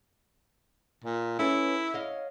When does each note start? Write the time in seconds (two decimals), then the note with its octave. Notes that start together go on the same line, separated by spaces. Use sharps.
1.05 A#2
1.39 C#4 E4 A4 B4
1.94 C#5 D#5 F5